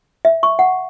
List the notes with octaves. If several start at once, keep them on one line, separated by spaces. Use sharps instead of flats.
E5
C#6
F#5